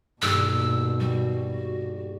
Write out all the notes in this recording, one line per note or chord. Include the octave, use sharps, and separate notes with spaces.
D#1 G2 B2 A#3 E6
G3 F#4